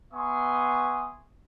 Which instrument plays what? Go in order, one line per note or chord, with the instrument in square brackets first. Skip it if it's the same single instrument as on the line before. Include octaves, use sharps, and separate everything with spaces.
[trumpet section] B3 E5 G#5 C6 C#6 D#6